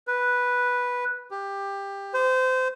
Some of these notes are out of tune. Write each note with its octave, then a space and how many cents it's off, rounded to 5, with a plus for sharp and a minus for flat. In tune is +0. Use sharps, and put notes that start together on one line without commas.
B4 -5
G4 +15
C5 -25